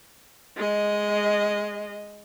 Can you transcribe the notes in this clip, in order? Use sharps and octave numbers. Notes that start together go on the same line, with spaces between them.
G#3 D#5